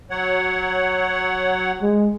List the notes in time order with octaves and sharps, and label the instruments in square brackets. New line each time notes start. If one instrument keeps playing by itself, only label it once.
[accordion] F#3 C#5 F#5
[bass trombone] G#3